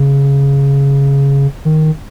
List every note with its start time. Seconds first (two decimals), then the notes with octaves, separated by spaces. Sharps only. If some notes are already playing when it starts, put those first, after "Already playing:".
Already playing: C#3
1.65 D#3